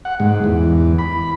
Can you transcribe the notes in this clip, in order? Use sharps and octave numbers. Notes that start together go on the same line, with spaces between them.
F#5
G#2
E2
B5